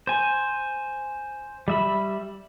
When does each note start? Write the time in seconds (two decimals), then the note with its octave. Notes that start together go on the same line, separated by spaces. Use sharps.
0.07 C5 G#5
1.68 G3 E5 B5